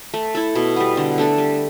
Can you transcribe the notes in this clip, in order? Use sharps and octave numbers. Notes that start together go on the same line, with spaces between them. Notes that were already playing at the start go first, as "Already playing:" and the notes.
A3
E4 A4
B2
G3 B3
D3
A3 D4 A4
G3